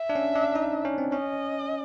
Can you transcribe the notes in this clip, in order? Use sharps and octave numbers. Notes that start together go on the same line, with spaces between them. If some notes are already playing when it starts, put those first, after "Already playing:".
Already playing: E5
D4
C#4
D4
D#4
C#4
C4
C#4 D#5